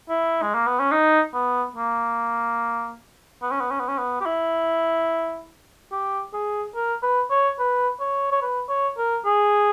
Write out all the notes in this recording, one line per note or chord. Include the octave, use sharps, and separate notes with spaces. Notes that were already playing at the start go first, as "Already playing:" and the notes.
E4
G#3
A#3
B3
C#4
D#4
B3
A#3
B3
C#4
B3
C#4
B3
C#4
B3
G4
E4
G4
G#4
A#4
B4
C#5
B4
C#5
C#5
B4
C#5
A#4
G#4